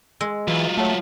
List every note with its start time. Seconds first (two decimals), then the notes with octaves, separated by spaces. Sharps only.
0.21 G#3 E6 G#6
0.48 E3 F#3 F4
0.77 A3 C#5 F#5 A5